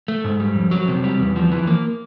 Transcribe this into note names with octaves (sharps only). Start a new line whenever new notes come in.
A3
G#2
G3
F2
F#3
C3
G3
E2
F3
E3
A#3